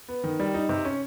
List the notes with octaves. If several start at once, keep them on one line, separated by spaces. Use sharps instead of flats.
B3
D#3
G3
D#4
C3
C#4